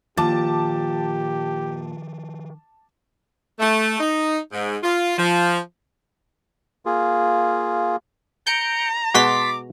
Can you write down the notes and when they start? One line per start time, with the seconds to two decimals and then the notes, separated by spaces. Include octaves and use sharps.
0.17 A#2 D#3 F3 G4 A5 D6 A6
3.59 A3
4.00 D#4
4.53 G#2
4.83 F4
5.17 F3
6.86 A#3 F4 G#4
8.47 A#5 G6 C#7 D7
9.15 B2 G#3 F#4 C6 D6 A6 B6